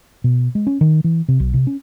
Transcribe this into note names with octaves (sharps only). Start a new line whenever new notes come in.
B2
G#3
C#4
D#3
E3
C3
B1
C3
C#4